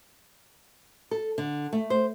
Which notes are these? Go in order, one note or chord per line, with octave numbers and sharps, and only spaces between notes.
A4
D3
A3
C5